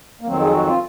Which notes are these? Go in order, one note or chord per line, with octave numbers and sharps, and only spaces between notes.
A#3
F2 D#3 F#3 C4
G#4
F#4
F4